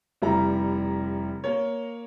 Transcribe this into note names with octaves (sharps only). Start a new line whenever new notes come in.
F1 G3 E4 A#5
A#3 A#4 C#5